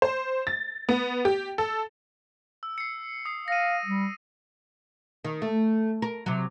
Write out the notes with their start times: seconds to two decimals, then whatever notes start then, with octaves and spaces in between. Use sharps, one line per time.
0.02 C5
0.47 A6
0.89 B3
1.25 G4
1.58 A4
2.63 E6
2.78 C7 C#7
3.25 D#6 C7
3.48 F5 A#6 D#7
3.85 G3
5.25 D#3
5.42 A3
6.02 A#4
6.26 C3 F#3